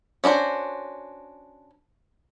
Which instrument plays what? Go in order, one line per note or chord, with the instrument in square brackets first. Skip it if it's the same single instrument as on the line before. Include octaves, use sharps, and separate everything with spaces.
[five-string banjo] C#4 D4 F#4 C5